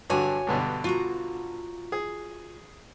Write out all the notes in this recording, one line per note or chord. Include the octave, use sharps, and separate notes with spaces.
G2 D3 F#4 C#5 G#5
G2 B2 D3
F4 F#4 A#5
G#4